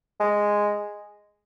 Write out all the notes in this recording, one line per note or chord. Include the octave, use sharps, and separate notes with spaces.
G#3